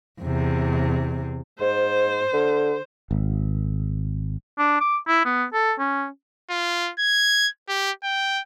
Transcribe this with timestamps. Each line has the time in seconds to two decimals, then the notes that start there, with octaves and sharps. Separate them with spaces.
0.21 E2 C3
1.60 G#2 C5
2.33 D3
3.11 G#1
4.58 D4
4.80 D6
5.08 E4
5.25 B3
5.53 A4
5.79 C#4
6.50 F4
6.99 G#6
7.68 G4
8.03 G5